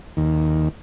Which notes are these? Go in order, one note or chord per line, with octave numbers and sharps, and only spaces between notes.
D#2